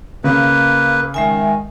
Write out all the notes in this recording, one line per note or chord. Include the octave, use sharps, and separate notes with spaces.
C#3 A#3 B4
D#3 G#3 E5 G#5